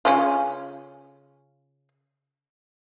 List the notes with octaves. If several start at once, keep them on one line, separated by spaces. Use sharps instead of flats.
C#3 C#4 F4